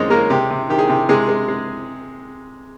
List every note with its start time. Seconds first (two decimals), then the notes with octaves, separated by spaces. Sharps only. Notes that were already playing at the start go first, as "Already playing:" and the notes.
Already playing: D#2 G#3 C4 C#4 C#5 D#5
0.10 G#3 A#3 A#4
0.30 C3 G4
0.51 C3
0.69 D#3 G4
0.78 G#4
0.87 C3 G4
1.09 C3 G#3 G#4
1.29 G#3
1.48 G#3